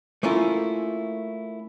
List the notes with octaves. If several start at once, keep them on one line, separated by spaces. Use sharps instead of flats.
A3 A#3 C#4 E4 F4